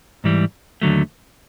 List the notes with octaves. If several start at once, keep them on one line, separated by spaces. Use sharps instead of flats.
G#2 E3 G3
D#2 D3 F#3 A3